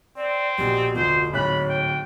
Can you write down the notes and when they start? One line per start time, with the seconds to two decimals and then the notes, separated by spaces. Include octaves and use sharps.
0.16 C4 D5
0.58 A#1 B2 G4
0.95 F1 D2 B2 F4 C5
1.33 D1 G#2 C#5 B5 F#6
1.69 G5